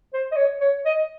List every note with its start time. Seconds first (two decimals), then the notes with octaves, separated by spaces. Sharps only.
0.14 C5
0.32 D#5
0.36 C#5
0.61 C#5
0.85 D#5